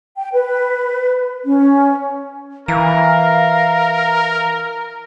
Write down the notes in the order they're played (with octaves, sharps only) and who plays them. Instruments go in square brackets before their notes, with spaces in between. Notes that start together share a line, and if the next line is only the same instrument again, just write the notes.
[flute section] G5
B4
C#4
[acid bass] E3 [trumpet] A#4 [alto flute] F5 [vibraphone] A#5